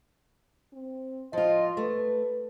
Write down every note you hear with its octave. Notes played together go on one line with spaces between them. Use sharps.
C4
F3 F4 D#5
A3 B4